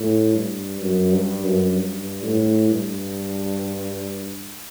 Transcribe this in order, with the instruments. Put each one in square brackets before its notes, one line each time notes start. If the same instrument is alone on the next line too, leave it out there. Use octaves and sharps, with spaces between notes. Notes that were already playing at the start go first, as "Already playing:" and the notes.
Already playing: [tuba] A2
G2
F#2
G2
F#2
G2
A2
G2